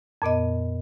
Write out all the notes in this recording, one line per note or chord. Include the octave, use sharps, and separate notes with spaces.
F2 A#2 B3 D#5